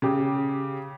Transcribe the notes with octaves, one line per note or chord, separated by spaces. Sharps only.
C#3 G4